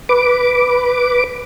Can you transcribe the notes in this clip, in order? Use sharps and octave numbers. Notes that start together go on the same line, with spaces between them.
B4 D6